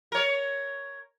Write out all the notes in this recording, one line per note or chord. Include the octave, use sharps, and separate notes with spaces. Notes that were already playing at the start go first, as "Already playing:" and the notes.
A#4 C#5